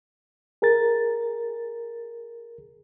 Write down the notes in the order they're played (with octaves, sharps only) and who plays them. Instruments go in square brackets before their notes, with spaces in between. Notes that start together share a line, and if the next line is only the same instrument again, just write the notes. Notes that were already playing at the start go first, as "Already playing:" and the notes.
[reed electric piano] G#4 A#4 A6